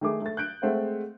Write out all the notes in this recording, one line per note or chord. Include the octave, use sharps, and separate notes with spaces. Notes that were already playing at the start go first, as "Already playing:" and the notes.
D#3 A3 G#4 D6
A3 A6
F#6 G6 D7
G#3 A3 C4 C5 F5 F#5